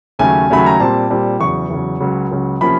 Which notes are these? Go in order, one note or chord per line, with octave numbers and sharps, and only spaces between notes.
D#2 C#3 F#3 A3 C#4 G#5
D#2 C#3 F#3 A3 C#4 B5
A#5
A#2 G3 C4 A5
A#2 G3 C4
E2 C#3 F#3 C#6
E2 C#3 F#3
C#2 C#3 F#3
C#2 C#3 F#3
C3 F3 A#3 C#4 B5